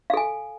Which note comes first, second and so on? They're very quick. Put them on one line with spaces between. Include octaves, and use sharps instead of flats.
F5 A4 G#5